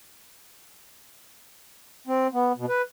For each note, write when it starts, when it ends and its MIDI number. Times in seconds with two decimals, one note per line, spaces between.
2.07 2.27 60
2.34 2.52 59
2.57 2.66 47
2.69 2.82 71